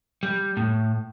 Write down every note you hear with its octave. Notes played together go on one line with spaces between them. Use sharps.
G3
A2